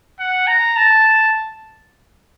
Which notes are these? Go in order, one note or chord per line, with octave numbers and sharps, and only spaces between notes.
F#5
A#5
A5